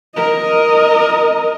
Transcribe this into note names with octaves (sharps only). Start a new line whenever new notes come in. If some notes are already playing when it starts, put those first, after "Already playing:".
A#4 D#5